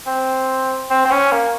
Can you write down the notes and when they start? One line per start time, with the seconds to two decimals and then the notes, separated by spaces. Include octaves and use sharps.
0.07 C4
0.90 C4
1.05 C4
1.11 C#4
1.32 A#3